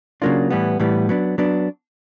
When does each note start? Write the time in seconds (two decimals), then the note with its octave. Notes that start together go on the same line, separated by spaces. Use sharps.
0.22 C#3 F#3 A#3 D4 F4
0.50 A2 E3 G3 B3
0.80 A2 E3 G3 B3
1.09 F#3 B3 D4
1.38 F#3 B3 D4